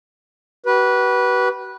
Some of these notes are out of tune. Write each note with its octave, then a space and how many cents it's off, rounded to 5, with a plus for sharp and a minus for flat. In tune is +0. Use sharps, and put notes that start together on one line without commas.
F#4 +45 B4 -15